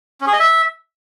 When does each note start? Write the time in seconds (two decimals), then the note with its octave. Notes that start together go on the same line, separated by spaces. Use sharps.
0.21 C#4
0.27 G#4
0.33 D#5
0.39 E5